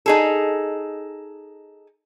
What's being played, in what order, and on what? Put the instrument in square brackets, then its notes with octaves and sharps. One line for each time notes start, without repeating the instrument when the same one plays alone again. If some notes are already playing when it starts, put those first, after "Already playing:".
[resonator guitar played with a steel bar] D#4 G#4 A4